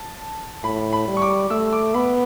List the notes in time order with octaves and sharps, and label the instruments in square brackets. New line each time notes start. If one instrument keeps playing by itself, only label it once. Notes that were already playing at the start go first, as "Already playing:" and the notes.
Already playing: [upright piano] A5
[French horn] A2 [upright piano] B5
[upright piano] B5
[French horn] G3
[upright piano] C#6
D6
[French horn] A3 [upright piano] E6
[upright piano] D6
[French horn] B3 [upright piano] B5